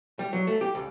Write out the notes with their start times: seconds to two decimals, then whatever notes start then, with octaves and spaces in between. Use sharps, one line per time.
0.19 G3
0.33 F#3
0.47 A3
0.61 G4
0.75 C#2